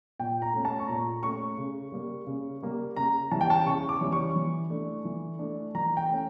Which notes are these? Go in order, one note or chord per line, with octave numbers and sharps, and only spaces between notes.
A#2 G5
A#5
A3 C#4
A5
C#6
A#2 A#5
A3 C#4 C#6
C#3
G3 A#3
C#3
G3 A#3
C#3 A#5
E3 G3 C#4 E4 A5
G5
A5
C#3 C#6
D6
E3 G3 C#4 E4
C#6
E3
A3 D4
E3
A3 D4
E3 A#5
G5
A3 C#4